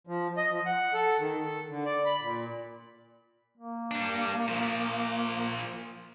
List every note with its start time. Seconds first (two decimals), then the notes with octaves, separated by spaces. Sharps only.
0.07 F3
0.37 D#5
0.50 F3
0.66 F#5
0.94 A4
1.19 D#3
1.39 A4
1.69 D3
1.85 D5
2.05 B5
2.21 A#2
3.58 A#3
3.91 G3 D4
4.48 A#2 F3